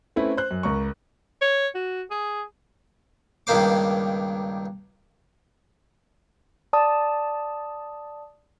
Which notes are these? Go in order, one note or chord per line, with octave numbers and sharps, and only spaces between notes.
A3 C4 C#4 E4 B4
C5 F#6
F#2
C#2 A#4 C#6
C#5
F#4
G#4
C#2 G2 D#3 A#3 C5 D6
D5 A5 D#6